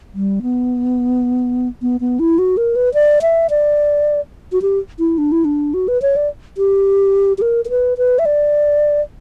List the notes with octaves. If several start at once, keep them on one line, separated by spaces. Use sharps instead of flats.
G3
B3
B3
B3
E4
F#4
A#4
B4
D5
E5
D5
F#4
G4
E4
D4
E4
D4
F#4
B4
C#5
D5
G4
G4
A#4
A#4
B4
B4
E5
D5